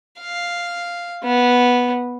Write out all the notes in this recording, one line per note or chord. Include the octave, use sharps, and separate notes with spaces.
F5
B3